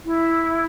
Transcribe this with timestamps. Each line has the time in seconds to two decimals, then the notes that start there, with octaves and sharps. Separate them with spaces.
0.04 E4